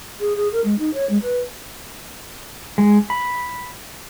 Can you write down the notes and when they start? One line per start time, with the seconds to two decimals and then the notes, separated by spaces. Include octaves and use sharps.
0.20 G#4
0.36 G#4
0.53 A#4
0.64 G#3
0.79 D#4
0.94 C#5
1.10 G#3
1.23 B4
2.78 G#3
3.10 B5